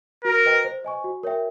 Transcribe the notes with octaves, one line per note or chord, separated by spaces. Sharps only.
F#4 A#4
B4 D#5 G5
C5
D#5 G#5 C#6
F#4
A#4 C#5 E5 G5